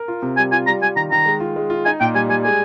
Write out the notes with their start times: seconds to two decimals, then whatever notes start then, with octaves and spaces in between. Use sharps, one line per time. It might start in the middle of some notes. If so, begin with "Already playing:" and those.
Already playing: A#4
0.08 F4
0.22 C3
0.37 G3 G#5
0.52 F4 G#5
0.67 G3 A#5
0.82 G3 G#5
0.96 D#3 A#5
1.11 D#3 A#5
1.26 G#3
1.40 F4
1.56 G#3
1.70 F4
1.85 D#4 G#5
2.00 A#2 G5
2.14 G3 G#5
2.29 G3 G#5
2.44 G#3 G#5